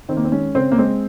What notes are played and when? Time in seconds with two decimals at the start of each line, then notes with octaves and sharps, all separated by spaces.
0.09 D#3 C4
0.17 A#3
0.24 C4
0.32 G#3 C#4
0.55 C#3 C4
0.72 A#3
0.78 G#3 C4